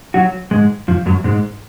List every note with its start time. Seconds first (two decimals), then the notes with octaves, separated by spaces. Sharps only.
0.14 F#3 F#4
0.51 G#2 G#3
0.88 F2 F3
1.06 F#2 F#3
1.24 G#2 G#3